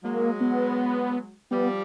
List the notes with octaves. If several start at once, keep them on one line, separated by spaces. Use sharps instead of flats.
F#3 G#3 A#3
B3
F3 G3 B3